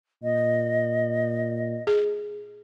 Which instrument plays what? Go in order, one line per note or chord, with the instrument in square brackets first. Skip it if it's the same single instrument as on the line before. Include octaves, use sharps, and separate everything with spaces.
[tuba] A#2 [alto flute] D#5
[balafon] G#4